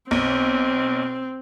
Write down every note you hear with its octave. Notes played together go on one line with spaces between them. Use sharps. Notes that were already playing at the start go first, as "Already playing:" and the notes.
B1 C4